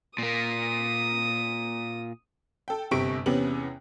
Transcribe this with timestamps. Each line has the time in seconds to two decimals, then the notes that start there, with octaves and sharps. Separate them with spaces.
0.18 A#2 A#3 D#6
2.68 A4 G5
2.91 G1 C3 C#6 B6 D7
3.26 E2 C3 B3 C#4 F#7